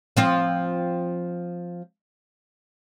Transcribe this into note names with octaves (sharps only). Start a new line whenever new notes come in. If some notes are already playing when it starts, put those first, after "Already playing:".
F3 C4 F4